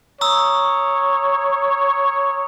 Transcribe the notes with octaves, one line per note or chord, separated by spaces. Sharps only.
C#5 A#5 D#6 E6